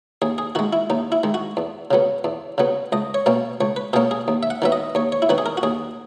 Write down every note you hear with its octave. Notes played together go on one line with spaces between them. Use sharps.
D#2 G#4
G#4
D#3 G#3 F#4
E4
D#2 D#4
E4
D#3 G#3
F#4
E2
C#3 F#3 B3
E2
C#3 F#3 B3
C#2 D#5
C#5
B2 A#3 C#4
C#2 C#5
B4
B2 A#3 C#4 G#4
G#4
D#2
E5
F#5
D#3 F#3 B3 E5
D#5
D#2 C#5
C#5
E4
D#3 F#3 B3 F#4
G#4
A#4
F#4
D#2 G#4